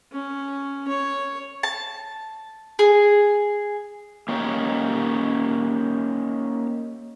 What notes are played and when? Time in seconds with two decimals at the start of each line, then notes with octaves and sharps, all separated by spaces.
0.12 C#4
0.88 C#5
1.63 A5
2.79 G#4
4.29 A#3 C#4 D#4 G4 C#5